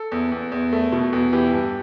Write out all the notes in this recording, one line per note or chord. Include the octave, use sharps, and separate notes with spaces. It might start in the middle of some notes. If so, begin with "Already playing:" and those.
Already playing: A4
E2
E2
E2
A3
B2
E2
E3 G4
G2